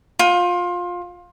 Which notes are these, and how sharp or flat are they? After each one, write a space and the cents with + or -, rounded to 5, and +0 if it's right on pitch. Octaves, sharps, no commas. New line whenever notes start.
F4 +20 G5 -15